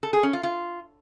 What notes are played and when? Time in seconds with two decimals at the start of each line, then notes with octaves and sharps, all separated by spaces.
0.03 A4
0.13 G#4
0.23 C#4
0.33 F4
0.43 F4